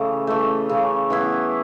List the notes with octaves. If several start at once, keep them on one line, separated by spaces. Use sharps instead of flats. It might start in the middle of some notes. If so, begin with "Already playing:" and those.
Already playing: C#3 E3 A3
E3 A3
C#3
E3 B3 E4